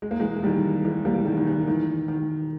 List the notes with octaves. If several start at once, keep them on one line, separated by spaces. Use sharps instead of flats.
G#3
A#3
E3 G#3
D#3 G3
E3 G#3
G3 A#3
D#3 G3
D#3
E3
D#3
D#3